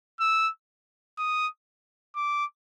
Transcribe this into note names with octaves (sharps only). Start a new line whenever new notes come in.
E6
D#6
D6